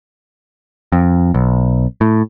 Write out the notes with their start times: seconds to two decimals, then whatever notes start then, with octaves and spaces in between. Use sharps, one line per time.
0.92 F2
1.34 B1
2.01 A2